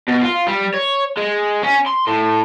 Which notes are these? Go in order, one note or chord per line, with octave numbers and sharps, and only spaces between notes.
B2
F4
G3
C#5
G#3
C#4
C6
A2